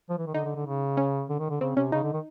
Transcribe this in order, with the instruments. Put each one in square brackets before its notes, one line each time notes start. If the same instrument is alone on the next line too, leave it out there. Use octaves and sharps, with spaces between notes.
[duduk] F3
E3
D#3
[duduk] D3 [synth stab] D#4
[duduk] D3
D3
C#3
[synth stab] C#4
[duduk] D3
D#3
D3
[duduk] C#3 [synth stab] C4
[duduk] C3 [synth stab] C#4
[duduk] C#3 [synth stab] D#4
[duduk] D3
D#3